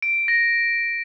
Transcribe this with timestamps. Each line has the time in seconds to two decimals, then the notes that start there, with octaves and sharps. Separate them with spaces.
0.02 D7
0.28 A#6